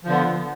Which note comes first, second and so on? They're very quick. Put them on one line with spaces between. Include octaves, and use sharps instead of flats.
F3 D3 B3